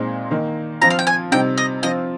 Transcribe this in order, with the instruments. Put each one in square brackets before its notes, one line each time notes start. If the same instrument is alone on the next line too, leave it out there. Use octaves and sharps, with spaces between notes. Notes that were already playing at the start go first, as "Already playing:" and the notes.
Already playing: [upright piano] A#2 G#3 C4 D#4
D#3 A#3 D#4
[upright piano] F3 C4 F4 [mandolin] A#5
[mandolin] F5
G5
G#5
[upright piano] C3 G3 C4 D#4 [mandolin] G5
[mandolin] D#5
[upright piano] F3 C4 F4 [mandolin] D#5